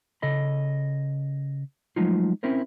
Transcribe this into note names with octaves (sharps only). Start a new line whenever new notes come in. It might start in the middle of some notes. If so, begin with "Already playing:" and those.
C#3 A4 D#5 B5
F3 F#3 G#3 A3 D#4 F4
C4 C#4 E4 A#4 C5